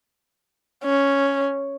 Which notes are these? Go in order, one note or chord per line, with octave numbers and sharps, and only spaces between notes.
C#4